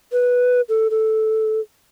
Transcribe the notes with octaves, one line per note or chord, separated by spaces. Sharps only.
B4
A4
A4